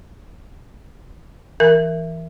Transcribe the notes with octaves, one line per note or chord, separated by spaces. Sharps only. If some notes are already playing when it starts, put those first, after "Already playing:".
E3 A#4